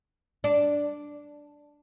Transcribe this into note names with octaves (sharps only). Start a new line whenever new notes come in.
D4